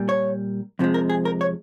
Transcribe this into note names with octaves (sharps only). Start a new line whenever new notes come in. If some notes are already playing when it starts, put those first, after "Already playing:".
Already playing: A#2 G3
C#5
F2 C3 F3 G#3
A#4
G#4
A#4
C#5